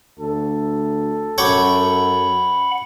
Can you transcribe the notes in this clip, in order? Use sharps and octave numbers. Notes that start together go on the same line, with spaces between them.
D2 A4
F#2 C#5 F#5 G5 B5 D6